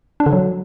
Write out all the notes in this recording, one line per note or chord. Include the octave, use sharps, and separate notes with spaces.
D4
D3
F#3